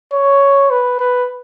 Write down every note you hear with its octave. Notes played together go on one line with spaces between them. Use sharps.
C#5
B4
B4